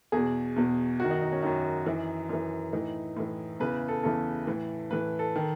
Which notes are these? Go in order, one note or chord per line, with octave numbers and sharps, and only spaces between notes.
E2 B2 G#4
E2 B2
F#2 D#3 F#4
D#4
D#4
C#4
F#2 D#3 D#4
F#2 E3
F#2 E3
A2 E3 D#4
A2 E3
E2 C#3 E3 B4
A4
E2 C#3 E3 A4
A2 E3
A2 E3 B4
A4
D#3